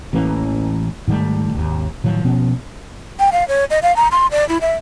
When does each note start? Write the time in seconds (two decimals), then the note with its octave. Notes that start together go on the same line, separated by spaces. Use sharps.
0.13 A1 E3 A#3 C#4
1.08 G#2 D#3 G3 A3
1.53 G#1 D#2
2.04 A2 D#3 F3 F#3
2.24 B2 F3 B3 C#4
3.19 G5
3.32 F5
3.48 C#5
3.70 D#5
3.83 F5
3.96 A#5
4.12 C6
4.31 D5
4.49 E4
4.61 E5